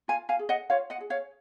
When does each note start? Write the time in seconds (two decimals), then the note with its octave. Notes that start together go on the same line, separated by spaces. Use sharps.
0.08 F4 F5 G#5
0.29 F5 G#5
0.39 G#4
0.49 D#5 F#5
0.70 F4 C#5 F5
0.90 D#5 F#5
1.01 G#4
1.10 C#5 F5